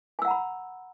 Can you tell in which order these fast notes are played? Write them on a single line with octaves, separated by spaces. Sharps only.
G#5 E6 F#5 A#5 B5